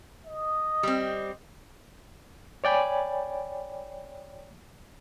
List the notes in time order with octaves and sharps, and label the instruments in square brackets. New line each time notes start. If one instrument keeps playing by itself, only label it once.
[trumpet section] D#5
[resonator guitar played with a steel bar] G3 C4
[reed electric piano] C#5 D5 G5 G#5 B5